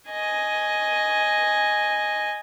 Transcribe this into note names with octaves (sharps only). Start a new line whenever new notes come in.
D#5 G#5